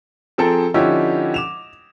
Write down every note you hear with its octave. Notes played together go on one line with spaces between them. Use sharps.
F3 C4 G#4 A4 G5 A#5
D3 F3 C#4 D#4 E4 G4
D6 E7 F7